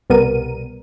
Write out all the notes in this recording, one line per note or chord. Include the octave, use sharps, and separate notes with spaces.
C2 B2 G3 B3 A#4 D#7